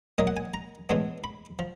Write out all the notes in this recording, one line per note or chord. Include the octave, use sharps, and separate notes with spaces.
A#2 F#3 A#3 D#5
F#5
G#5
A#5
A2 E3 G#3 B3 D4
B5
F3